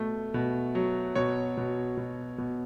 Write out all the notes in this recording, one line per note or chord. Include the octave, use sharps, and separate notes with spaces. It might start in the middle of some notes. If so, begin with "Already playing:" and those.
Already playing: B2 A3
B2
F#3
B2 C#5
B2
B2
B2